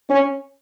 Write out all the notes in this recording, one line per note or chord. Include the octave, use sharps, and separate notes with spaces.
C#4